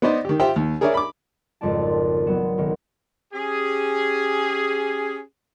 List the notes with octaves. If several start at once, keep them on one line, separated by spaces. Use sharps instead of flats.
B3 D#4 C5 D5 D#5
D#3 G4
F4 G4 C5 E5 G5
D#2
G#4 A#4 C#5 D5 E5 G#5
B5 D6
G#1 F2 C#3 C4 D5 A5
F#3 B3 E7
B1 D#3
C#4 G4 G#4